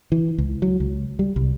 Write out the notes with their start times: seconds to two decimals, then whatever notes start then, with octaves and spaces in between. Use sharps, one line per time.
0.12 E3
0.38 C#2
0.62 F#3
0.80 C#2
1.19 G3
1.36 C2